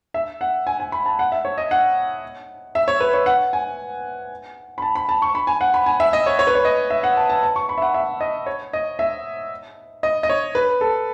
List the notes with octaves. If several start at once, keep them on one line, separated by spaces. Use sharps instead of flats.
E5
F#5
G#5
G#5
B5
A5
F#5
E5
C#5
D#5
F#5
E5
C#5
B4
C#5
F#5
G#5
B5
A5
B5
A5
C#6
B5
G#5
F#5
B5
G#5
E5
D#5
C#5
C#5
B4
C#5
D#5
E5
F#5
A5
A5
A5
C#6
B5
E5
F#5
E5
D#5
C#5
D#5
E5
D#5
D#5
C#5
B4
A4